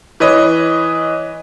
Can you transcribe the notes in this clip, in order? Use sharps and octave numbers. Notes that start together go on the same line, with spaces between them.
E3 B4 C#5 D#5